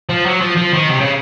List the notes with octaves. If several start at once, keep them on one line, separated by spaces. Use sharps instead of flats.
F3
F#3
F3
F3
D#3
C3
C#3